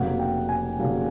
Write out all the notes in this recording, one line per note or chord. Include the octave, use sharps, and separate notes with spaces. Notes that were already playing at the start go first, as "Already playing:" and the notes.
Already playing: F1 F2 C#3 F#3 A#3 F#5
G5
G#5
F1 F2 C#3 F#3 A#3